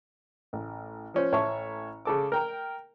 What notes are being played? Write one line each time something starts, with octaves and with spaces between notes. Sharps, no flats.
A1
F3 C#4 C5
A1 C#5 E5 A5 C#6
C#3 A4 D6
A#4 G5 A#5